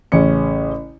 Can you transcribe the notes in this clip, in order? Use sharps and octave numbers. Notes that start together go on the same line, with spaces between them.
A1 C#3 C#4 C#7